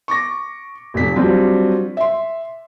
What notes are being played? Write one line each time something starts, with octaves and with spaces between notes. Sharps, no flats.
C#6 D6 A#6
F1 F2 B6
F#3 G3 C4 D4 F4
E5 C6